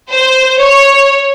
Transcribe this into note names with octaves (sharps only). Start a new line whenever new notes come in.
C5
C#5